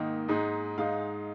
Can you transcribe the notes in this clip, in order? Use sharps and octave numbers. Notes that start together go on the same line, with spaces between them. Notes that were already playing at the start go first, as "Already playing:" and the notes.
Already playing: G#2 D#3 A#3 D#4
G#2 G#3 D#4
G#2 G#3 D#4 F5